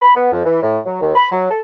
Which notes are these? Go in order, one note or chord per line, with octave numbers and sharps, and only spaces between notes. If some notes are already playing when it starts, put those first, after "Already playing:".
B5
B3
F2
E3
A2
F#3
D#2
B5
F#3
A4